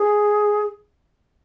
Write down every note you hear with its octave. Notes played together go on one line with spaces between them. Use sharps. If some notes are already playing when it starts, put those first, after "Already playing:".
Already playing: G#4